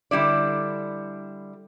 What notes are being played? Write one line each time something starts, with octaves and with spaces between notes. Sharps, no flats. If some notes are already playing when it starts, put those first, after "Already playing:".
D3 G3 E4 D5